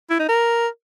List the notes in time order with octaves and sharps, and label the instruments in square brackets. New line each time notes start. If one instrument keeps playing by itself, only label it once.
[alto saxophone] E4
D#4
A#4